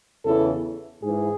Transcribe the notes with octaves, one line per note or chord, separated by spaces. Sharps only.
E2 C#3 E3 A4
G#2 E3 G#4